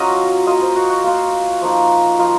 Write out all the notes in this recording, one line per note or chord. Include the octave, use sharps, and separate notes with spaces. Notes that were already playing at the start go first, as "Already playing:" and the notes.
Already playing: F#3 C#4 F4 D#5 A#5
A#3 F4 D#5
C5
F#4
F#4
A#3 F4
F3 A#3 D#4
F3 A#3 D#4 F4